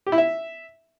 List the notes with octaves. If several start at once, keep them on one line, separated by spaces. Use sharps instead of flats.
G4
E4
E5